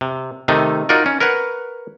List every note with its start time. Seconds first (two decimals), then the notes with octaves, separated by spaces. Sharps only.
0.01 C3
0.48 C3 D#3 A3 D#4
0.89 D#4 F4 F#4 A#4 D5
1.06 C#4
1.20 A#4 B4 C#5 F#5